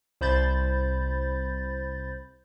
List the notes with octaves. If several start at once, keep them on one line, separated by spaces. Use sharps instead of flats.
C2 C5 B5 G6 A6